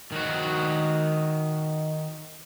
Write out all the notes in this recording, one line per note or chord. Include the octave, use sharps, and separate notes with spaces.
D#3 F#4